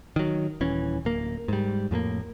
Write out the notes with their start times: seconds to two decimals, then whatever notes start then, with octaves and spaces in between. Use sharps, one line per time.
0.16 D#3 F#3
0.61 D#1 E3 C#4
1.05 D1 A#3
1.48 G#2 G3
1.91 F2 A2 A3 A#3